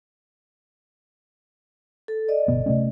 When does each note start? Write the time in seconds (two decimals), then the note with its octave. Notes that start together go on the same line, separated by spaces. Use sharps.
2.08 A4
2.29 D5 D#5
2.48 G1 B2 B3
2.66 C3 A3 C#4